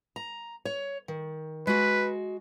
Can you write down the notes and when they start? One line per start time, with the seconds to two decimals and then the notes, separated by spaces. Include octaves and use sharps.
0.16 A#5
0.65 C#5
1.08 D#3
1.67 G#3 F#4 B4